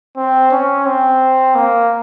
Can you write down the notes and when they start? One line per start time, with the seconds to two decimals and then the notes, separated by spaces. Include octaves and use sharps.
0.17 C4
0.52 C#4
0.86 C4
1.55 A#3